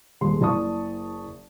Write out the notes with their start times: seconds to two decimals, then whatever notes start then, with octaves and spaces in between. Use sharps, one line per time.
0.21 D#1 G#3 C6
0.41 F#1 E4 D5 A5 C#6 D#6